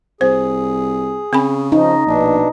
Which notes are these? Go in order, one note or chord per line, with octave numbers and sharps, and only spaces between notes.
C2 G#4 C5
C#3 C4 G#5 B5
F3 D#4
A#1 B2 D4